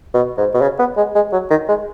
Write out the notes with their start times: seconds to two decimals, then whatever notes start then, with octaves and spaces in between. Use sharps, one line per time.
0.14 B2
0.37 G#2
0.54 B2
0.62 C#3
0.79 B3
0.97 G#3
1.15 G#3
1.32 F#3
1.50 D#3
1.69 G#3